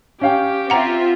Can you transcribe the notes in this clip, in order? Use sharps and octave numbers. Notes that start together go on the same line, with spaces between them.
C#4 G4 F5 G5
C4 F4 E5 F#5 A#5